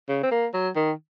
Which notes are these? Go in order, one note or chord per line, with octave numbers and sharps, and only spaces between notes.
C#3
C4
A#3
F#3
D#3